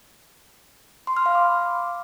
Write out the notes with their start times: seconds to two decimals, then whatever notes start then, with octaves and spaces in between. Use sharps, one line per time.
1.07 C6
1.17 F6
1.26 F5
1.35 D6
1.44 B5